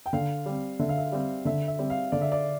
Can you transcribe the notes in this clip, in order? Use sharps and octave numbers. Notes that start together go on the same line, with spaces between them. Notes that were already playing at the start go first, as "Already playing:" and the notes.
G5
D3 F5
G3 C4
D3 E5
F5
E5
G3 C4
D3 E5
E5
G3 C4
F5
D3 D5
E5
D5